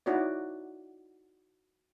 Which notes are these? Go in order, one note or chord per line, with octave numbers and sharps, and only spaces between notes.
D#4 E4 F#4 C#5 D5